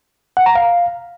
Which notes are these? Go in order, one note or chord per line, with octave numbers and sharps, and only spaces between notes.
F#5
A#5
F5